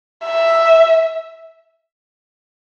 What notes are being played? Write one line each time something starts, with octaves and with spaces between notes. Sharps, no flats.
E5